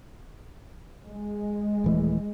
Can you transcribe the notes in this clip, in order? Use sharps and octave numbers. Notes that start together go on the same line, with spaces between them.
G#3
D#1 E3 A3